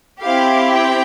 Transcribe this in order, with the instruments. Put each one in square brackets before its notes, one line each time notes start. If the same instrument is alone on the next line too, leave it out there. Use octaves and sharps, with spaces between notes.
[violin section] C4 E4 G4 F5
G5